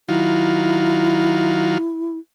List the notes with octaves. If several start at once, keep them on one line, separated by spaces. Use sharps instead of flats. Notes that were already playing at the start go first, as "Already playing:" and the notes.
D#3 F#3 E4 F4